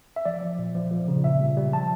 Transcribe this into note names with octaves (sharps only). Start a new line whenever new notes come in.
E5
F3 D5
F3
A#2
F3
F3
C#3
A#2 E5
G3
G3
F3 A5